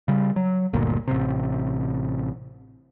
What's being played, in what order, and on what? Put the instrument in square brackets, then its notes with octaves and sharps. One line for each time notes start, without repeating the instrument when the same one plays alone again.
[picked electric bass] C#3 G3
F#3
G1 D2 A#2
A1 C3